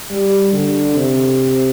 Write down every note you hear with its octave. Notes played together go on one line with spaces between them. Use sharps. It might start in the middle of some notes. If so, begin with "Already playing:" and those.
G3
D3
C3